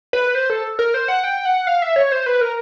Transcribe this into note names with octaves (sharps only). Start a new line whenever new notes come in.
B4
C5
A4
A#4
C5
F#5
G5
F#5
F5
E5
C#5
C5
B4
A#4